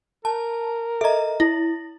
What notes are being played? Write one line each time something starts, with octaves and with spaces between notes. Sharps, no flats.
A#4 A5
A4 D#5 E5 A#5
E4 A#6